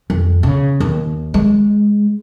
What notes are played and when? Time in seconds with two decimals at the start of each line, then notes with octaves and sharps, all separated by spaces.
0.10 F2
0.43 C#3
0.80 D#2
1.34 G#3